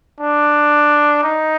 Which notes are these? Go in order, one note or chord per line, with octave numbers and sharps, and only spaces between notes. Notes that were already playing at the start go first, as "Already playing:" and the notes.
D4
D#4